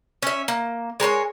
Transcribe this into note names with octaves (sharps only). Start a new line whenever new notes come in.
C#4 E5
A#3
G#3 A#4 B4 C#5